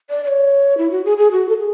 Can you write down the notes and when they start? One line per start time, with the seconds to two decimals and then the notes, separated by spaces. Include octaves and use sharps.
0.10 D5
0.24 D5
0.28 C#5
0.78 E4
0.91 F#4
1.05 G#4
1.17 G#4
1.32 F#4
1.49 A4
1.59 G#4